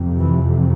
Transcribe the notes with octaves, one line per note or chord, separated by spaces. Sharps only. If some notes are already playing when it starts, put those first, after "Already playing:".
Already playing: F2 C3
E3